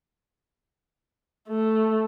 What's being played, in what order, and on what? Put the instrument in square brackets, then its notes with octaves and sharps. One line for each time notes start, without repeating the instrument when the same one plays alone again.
[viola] A3